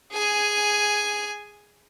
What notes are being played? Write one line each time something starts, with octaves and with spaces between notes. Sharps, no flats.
G#4 G#5